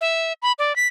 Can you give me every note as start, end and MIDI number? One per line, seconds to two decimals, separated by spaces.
0.01 0.33 76
0.42 0.52 83
0.59 0.75 74
0.76 0.87 95